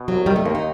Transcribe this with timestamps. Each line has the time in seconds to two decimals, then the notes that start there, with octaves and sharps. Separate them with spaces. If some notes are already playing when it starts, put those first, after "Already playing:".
Already playing: B2
0.08 C2 F#3
0.26 D#3 G3
0.36 A3
0.45 D#2 A#3
0.55 D#4